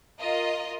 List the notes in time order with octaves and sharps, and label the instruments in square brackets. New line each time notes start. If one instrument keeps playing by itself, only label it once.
[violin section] F4 A#4 D#5